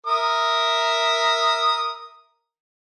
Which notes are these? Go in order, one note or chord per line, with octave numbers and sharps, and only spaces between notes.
A#4 E5 D#6